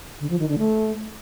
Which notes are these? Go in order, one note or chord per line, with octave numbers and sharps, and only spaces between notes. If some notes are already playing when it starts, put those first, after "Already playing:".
D3
F3
D#3
D3
A3